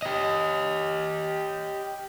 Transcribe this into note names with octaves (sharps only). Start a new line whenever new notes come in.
G4 D#5